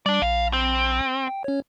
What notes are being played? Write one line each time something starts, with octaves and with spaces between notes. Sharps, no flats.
G3 D4 D5
A#1 F5
C4
G5
C#4 C#5